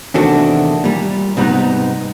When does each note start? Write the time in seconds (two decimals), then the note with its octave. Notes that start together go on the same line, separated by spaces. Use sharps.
0.14 E2 C3 D#3 A3 D4 F#4
0.84 A#2 G3
1.37 G#2 C3 G3 A#3 B3 D#4